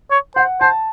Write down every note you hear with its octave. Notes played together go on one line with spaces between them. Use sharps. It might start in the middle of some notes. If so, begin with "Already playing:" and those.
C#5
C5 F#5
C5 A5